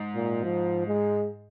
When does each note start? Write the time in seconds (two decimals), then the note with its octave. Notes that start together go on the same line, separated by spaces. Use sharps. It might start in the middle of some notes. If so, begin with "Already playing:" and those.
Already playing: G#2
0.15 A#2
0.44 F3
0.88 G#3